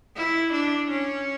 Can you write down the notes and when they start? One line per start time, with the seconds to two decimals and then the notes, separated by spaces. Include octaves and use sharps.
0.16 E4
0.53 D4
0.89 C#4